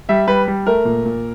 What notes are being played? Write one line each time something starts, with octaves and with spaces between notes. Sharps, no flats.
G3 E5
G3 B4
G3
A3 A#4
A#2
A#2